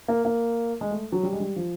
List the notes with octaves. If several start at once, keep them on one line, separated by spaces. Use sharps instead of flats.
A#3
A#3
G#3
A3
F#3
G3
G#3
G3
F3